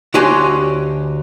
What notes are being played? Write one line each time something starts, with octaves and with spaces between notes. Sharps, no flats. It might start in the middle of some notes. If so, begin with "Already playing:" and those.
D2 F#4 G4 C#5 G#5 C6